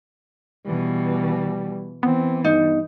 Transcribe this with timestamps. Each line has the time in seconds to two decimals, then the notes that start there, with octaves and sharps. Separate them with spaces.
0.66 B2 E3 G3
2.03 E3 B3 C4
2.45 G2 D#4